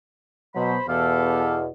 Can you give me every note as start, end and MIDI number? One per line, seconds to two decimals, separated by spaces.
0.55 0.76 47
0.55 0.76 54
0.55 0.84 72
0.55 0.84 83
0.88 1.69 40
0.88 1.69 47
0.88 1.59 67
0.88 1.59 69
0.88 1.59 77